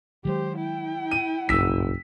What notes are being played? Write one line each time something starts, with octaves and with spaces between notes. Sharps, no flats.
D#3 F#3 G#3 G4 C5
E4 G5
D#7
F#1 B1 G2 E6 B6